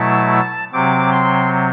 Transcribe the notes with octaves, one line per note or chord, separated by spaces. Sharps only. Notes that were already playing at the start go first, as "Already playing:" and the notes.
Already playing: B2 F#3 A3 E4 A5
C3 F#3 C4 D6
C6